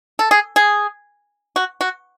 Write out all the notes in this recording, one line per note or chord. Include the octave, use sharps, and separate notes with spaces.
A4
G#4
G#4
F#4
F#4